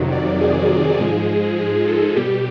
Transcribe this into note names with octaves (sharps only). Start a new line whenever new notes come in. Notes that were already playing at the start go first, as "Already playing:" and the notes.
Already playing: F2 C3 D#3 F#3
D5
G#4
G#2 F3 G#3 G#4
G#4
A4
B2 G3 G4